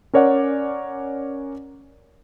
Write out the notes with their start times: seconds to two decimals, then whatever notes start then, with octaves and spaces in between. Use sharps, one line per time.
0.13 C#4 A#4 C#5 D5 F#5